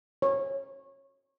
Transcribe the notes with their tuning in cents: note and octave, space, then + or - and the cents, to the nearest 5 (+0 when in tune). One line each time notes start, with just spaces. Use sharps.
C#5 -20